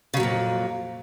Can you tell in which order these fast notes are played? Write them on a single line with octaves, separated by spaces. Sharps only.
C#3 F#3 A#2 F2